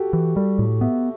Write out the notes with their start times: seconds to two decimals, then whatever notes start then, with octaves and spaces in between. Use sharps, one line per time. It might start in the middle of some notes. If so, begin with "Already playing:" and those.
Already playing: F#4 G4 A4
0.13 E3
0.36 G3 A4
0.59 A2
0.81 B3 E5